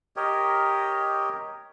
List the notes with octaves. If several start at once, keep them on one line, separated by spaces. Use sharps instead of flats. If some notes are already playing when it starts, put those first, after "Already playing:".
G4 A#4 C#5 D#5